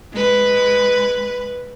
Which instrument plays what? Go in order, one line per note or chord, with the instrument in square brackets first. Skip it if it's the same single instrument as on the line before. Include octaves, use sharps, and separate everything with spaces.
[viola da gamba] G#3 B4